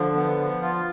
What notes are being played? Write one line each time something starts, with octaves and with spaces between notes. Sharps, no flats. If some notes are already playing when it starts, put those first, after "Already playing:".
Already playing: D3 F3
B3
F3
F4